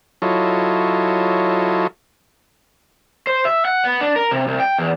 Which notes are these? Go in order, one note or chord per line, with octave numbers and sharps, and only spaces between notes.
F#3 E4 F4 A4 C#5 D#5
C5
E5
F#5
B3
D4
A#4
C3
C2
G5
E2